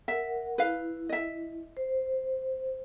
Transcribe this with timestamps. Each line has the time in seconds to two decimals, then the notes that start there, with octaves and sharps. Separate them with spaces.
0.08 A#4 E5 F#5
0.58 E4 B4 F5
1.09 D#5 E5
1.77 C5